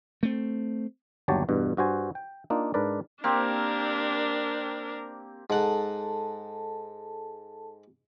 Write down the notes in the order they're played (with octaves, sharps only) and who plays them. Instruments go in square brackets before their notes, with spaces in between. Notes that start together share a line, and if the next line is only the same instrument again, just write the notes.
[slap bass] A3 C4
[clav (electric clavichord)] G1 D#2 F#3 G4 C#5 A5
E2 G2 B2
G2 F#4 C5 G#5
G5
A#3 D4 D#4 F4
G#2 D4 A#4 B4 D5
[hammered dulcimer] A#3 C4 G4 [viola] D4 A#4
[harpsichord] G#2 F#5 [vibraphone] A4 A5